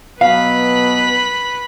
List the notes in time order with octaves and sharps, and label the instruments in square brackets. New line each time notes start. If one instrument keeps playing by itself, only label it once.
[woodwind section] B2 F#3 B3 [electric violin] B4 B5 [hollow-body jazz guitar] F5